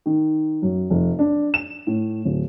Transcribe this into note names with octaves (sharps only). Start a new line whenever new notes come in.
D#3
F#2
F1
D4
E7
A2
D1